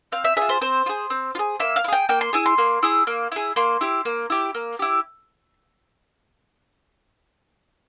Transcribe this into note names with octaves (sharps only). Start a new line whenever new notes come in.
C4 F5
E5
F4 G#4 E5
C5
C4 C5
F4
G#4
C4
F4
G#4
A#3 E5
F5
E4
G#4 G5
A#3 G5
C6
E4 G#4 G#5
C6
A#3
E4 G#4
A#3
E4 G#4
A#3 C6
E4 G4
A#3
E4 G4
A#3
E4 G4